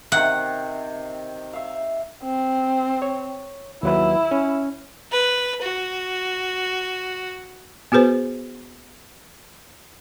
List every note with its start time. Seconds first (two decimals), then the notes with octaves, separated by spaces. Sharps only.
0.12 C3 D#3 F#5
1.53 E5 F5
2.23 C4
3.02 C#5
3.83 D#2 F#3 E4 B4
4.31 C#4
5.12 B4
5.62 F#4
7.92 B3 F#4 G#4 B4 C5